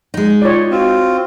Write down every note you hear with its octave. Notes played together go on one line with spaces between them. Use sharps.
G#3 D#4
F4 C#5 D5
C4 F4 F#4